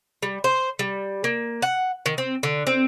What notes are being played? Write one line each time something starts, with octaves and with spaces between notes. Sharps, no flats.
G3
C5
G3
A#3
F#5
D#3
C4
D3
C4